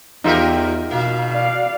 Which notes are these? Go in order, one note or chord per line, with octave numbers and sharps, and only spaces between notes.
E2 E3 D#4 F4 G4 A#4 E5
B2 A#3 F5
D5 F5